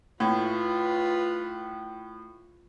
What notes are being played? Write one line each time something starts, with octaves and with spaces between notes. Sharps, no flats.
A2 F4 B4